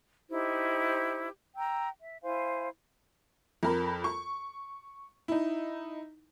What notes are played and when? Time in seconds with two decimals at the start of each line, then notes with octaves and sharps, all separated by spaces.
0.30 D#4 E4 G4 C5
1.57 G5 A#5 E6
2.00 E5
2.22 E4 C5 F5 G#5
3.63 F2 A#4 B5
4.04 C#6
5.28 D#4 E4